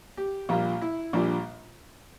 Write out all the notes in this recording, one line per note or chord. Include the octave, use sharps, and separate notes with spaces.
G4
A#1 A#2 G3 F4
E4
A#1 A#2 G3 D4